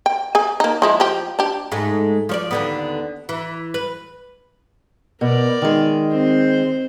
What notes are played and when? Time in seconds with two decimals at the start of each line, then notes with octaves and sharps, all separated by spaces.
0.06 G5
0.35 G#4 G#5
0.60 A#3 D#4
0.82 F3 G#3 E4
1.00 F3 G4
1.39 D4 G4
1.72 G#2 G#3 A3
2.29 F3 C#5 D5
2.51 D#2 D3 B3
3.29 E3
3.74 B4
5.21 B2 A#4 D5
5.62 D#3 G#3
6.11 C4 C5